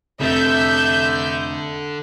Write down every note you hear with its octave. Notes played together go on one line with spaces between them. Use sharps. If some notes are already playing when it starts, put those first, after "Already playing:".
F1 D3 E5 G6